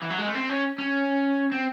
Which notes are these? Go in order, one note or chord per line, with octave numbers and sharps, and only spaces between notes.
E3
F#3
G#3
A3
C4
C#4
C#4
C4